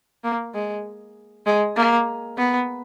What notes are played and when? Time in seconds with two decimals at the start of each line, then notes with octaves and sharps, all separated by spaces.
0.24 A#3
0.54 G#3
1.46 G#3
1.76 A#3
2.38 B3